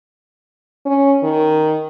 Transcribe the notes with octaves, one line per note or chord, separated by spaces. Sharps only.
C#4
D#3